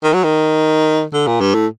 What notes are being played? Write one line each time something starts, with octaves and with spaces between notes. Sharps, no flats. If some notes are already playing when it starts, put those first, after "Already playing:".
D#3
F#3
D#3
D3
A#2
G2
A2